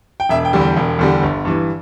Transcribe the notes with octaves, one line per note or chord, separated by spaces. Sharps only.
G5
E1 E5
G5
E2 D3 G3
G5
E1
E2 D3 G3
G1
G2 E3